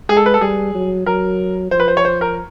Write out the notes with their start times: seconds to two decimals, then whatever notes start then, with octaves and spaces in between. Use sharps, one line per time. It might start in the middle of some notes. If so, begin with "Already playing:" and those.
0.09 G#3 G#4
0.17 A4
0.26 B4
0.34 A4
0.41 G3 G#4
0.74 F#3
1.06 F#3 A#4
1.71 F3 C5
1.80 B4
1.88 C5
1.97 C#5
2.05 C5
2.21 A#4